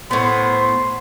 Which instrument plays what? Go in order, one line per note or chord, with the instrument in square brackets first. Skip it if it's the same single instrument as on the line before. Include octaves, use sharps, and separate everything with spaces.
[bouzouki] A2 B3 [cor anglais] C5